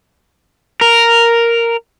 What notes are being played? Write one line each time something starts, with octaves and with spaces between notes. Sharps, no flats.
A#4